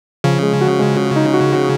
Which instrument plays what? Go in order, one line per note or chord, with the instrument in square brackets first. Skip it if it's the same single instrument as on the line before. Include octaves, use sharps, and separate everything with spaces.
[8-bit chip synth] C#3 [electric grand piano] F3
[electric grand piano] G#3
F#4
G#3
F#4
D#4
F#4
F#4